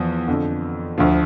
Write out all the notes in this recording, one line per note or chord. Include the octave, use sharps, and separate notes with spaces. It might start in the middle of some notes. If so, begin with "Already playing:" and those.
Already playing: E2 F3
F2 D3 F3
D2 D3 F3